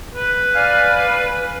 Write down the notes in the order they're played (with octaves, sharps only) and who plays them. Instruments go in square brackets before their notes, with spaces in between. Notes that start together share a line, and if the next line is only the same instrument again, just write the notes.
[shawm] B4
[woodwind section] D5 F5 G#5